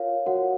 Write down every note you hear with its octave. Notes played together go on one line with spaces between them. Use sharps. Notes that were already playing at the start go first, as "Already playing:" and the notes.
Already playing: F4 A#4 C#5 F5
F#4 A#4 C#5 F#5